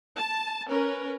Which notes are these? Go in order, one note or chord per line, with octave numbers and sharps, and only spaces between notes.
A5
C#4 A#4 B4